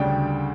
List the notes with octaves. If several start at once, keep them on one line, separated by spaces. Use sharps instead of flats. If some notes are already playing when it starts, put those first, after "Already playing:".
Already playing: D2 C#3 G3 D4 G5